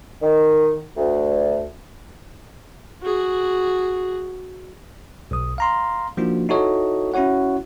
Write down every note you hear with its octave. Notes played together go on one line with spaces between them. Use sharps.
D#3
D2
F#4 G#4
B1 D#6
F5 A#5 C6
F3 A#3 D4 D#4 F4 F#4
D#4 E4 F#4 A4 C#5 D#5
C#4 E4 F#4 C#5 F#5